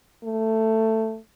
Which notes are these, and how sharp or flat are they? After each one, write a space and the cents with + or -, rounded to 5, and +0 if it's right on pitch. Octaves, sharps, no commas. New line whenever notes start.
A3 +10